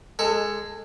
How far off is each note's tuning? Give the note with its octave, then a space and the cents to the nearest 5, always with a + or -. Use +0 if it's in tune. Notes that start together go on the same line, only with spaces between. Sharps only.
G#3 +0 A4 +25